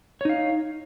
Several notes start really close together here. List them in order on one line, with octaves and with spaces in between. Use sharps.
C#5 D#4 F5